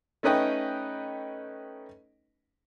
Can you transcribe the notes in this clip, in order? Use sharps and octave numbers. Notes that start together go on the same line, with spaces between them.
A3 C#4 D#4 B4 D#5 G5